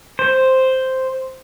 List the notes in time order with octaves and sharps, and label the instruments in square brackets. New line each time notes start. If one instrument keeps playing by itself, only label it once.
[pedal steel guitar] C5